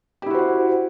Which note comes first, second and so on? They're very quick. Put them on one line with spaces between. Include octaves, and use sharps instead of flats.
G4 E4 F#4 C5 F#5